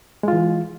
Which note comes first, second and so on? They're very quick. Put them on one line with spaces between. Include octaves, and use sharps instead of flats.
G#3 F4 E3